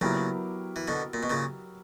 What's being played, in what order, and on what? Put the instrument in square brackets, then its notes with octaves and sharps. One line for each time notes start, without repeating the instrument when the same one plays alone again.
[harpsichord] A#2 C#3 [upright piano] F#3 B3 E4 G4 A#4
[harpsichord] E3
B2 D3
A#2
B2
A#2 C#3